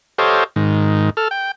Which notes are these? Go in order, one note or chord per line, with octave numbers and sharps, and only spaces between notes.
G4 A4 C5 C#5 D#5 F5
G#2 D#3
A4 F6
G5